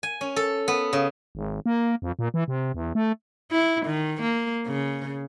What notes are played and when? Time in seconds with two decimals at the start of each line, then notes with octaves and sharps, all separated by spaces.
0.03 G#5
0.21 C#4
0.36 A4
0.68 B3
0.93 C#3
1.35 G#1
1.66 A#3
2.02 F2
2.19 A#2
2.34 E3
2.48 C3
2.74 E2
2.95 A3
3.52 E4
3.86 D#3
4.22 A#3
4.67 C#3